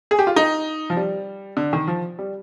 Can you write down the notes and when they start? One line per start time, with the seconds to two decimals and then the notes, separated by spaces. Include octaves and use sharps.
0.11 G#4
0.19 G4
0.27 F4
0.36 D#4
0.90 F3
0.97 G3
1.57 D3
1.73 D#3
1.88 F3
2.19 G3